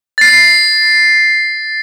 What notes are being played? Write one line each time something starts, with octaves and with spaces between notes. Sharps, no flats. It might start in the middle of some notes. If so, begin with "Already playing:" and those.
A6 C7